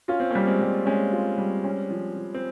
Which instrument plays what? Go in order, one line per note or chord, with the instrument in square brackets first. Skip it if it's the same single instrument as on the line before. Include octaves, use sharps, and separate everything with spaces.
[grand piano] C#4 [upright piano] F4
[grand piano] C4
[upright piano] G3 [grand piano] A#3 C#4
[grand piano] G#3 C4
[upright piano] G3
[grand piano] G#3 C4 [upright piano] C#4
[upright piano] F4
G3
C#4
F3
F3
[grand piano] C4